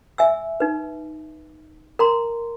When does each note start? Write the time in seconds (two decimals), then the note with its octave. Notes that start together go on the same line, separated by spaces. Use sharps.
0.18 E5 G#5 E6
0.60 D#4 B4
1.99 A#4 A#5 C6